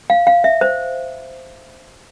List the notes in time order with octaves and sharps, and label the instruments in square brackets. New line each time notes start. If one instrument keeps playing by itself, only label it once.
[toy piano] F5
F5
E5
C5